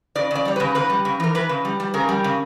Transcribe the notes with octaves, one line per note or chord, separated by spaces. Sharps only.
C#3 D5
C#3 D5
G3 C#5
C#3 B4
C#3 B4
G3
C#3
E3 A#4
E3 B4
C#3
G3
G3
C#3 A#4
G3
C#3